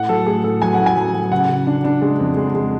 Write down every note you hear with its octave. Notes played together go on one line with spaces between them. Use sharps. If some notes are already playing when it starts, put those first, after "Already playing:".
Already playing: A2 F#5
F#3 A4
A3 G#4
A2 A4
F#3 G#5
F#5
A2
G#5
F#3
F#3
C#3 F#5
C#3
D4
D4
G#3
F2
G#3
G#3